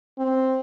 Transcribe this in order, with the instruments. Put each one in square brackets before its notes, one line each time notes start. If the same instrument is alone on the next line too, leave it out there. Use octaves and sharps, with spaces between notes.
[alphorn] C4